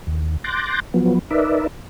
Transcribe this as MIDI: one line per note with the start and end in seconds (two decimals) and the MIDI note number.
0.07 0.37 39
0.44 0.80 84
0.44 0.80 86
0.44 0.80 90
0.44 0.80 91
0.44 0.80 93
0.44 0.80 94
0.94 1.19 53
0.94 1.19 54
0.94 1.19 59
1.30 1.67 63
1.30 1.67 70
1.30 1.67 71
1.30 1.67 74
1.30 1.67 76